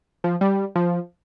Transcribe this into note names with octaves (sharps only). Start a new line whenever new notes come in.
F3
G3
F3